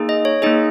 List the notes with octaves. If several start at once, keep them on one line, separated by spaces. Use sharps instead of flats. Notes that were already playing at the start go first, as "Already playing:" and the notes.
Already playing: A#3 D#4 G#4
D#5
C#5
A#3 D#4 G#4 D#5